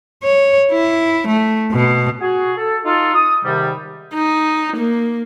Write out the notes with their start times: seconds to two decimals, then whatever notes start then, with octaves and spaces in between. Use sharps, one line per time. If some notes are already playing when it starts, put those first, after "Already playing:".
0.23 C#5
0.72 E4
1.27 A3
1.72 B2
2.21 F#4 G#4
2.58 A4
2.84 D#4 F4 A4
3.14 D#6
3.44 G#2 C3 D#3 G3
4.14 D#4
4.77 A#3